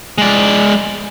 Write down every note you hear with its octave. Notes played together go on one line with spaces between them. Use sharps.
G#3 D5